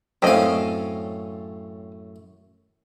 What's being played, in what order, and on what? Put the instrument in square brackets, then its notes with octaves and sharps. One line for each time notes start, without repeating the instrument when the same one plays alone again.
[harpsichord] F#2 A2 F5 [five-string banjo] C4 C#4 D#5